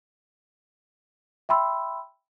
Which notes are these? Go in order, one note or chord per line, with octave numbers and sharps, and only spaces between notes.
E5 G5 B5 C6 E6